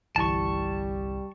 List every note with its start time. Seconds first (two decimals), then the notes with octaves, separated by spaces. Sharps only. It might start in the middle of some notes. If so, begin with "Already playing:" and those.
0.16 G1 C2 E3 G3 A5 C#6